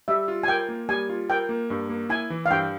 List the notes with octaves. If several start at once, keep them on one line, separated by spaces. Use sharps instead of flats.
G3 E5
F4
G#5
A#4 G5
A#3
G3 G#5
F4
A#4 G5
A#3
G2
A#3
E4 G#5
E3
F5
G2 G5